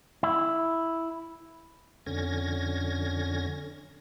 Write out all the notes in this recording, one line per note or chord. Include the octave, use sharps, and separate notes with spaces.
E4
F2 D3 C#4 G#6 A#6